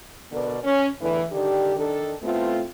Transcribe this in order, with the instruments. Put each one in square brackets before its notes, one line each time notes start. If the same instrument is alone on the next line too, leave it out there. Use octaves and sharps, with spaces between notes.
[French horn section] B2 D3 B3 A#4 B4 D5
C#4
E2 A2 D3 E3
D3 D#3 D4 G4
D#3 D4 A4
A2 A3 B3 C4 F4